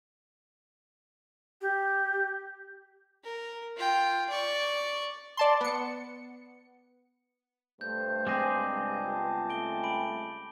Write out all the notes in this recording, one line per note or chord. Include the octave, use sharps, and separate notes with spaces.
G4
A#4
F4 G5
D5 C#6
D5 A5 C6
B3 C#7
G2 A3 C5 G6
G#3 C4 G#4 D6 A#6
C#2 G3 A5
B3
A3 D7 G7
B5 D7